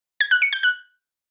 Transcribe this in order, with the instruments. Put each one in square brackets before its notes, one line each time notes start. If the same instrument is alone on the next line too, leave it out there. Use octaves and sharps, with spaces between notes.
[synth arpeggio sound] G#6
F#6
C#7
G6
F#6